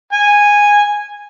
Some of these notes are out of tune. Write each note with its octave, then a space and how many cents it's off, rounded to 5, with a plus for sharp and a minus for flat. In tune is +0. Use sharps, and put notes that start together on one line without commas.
G#5 -10